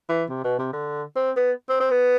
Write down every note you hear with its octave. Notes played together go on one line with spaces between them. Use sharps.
E3
C3
B2
C3
D3
C4
B3
C4
C4
B3